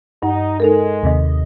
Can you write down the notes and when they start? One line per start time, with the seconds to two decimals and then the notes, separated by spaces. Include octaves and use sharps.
0.23 G2 D#4 F#5
0.60 G#3 D#4 A4 A#4
1.03 D#2 C3 D#5